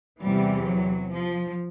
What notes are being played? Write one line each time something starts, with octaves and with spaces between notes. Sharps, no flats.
E2 C3 E3 G3
F#3
F3